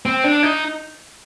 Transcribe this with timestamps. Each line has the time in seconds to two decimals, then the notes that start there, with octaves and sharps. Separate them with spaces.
0.06 C4
0.24 D4
0.43 D#4